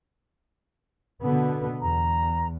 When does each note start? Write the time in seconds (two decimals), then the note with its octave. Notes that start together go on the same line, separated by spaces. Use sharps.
1.24 B2 D3 B3
1.81 E2 A#5